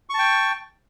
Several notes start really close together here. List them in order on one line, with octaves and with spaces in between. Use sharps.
C#6 A5 G5